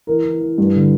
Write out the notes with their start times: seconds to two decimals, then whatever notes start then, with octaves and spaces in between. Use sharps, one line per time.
0.07 E3 A#4
0.24 E3
0.41 E3
0.58 G2
0.75 D3